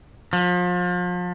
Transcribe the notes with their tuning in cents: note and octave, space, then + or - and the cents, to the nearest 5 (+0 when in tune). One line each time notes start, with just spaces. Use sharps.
F3 +35